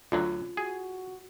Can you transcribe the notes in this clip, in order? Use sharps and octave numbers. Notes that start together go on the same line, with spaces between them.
D2 D3 F#3 F4
F#4 G#4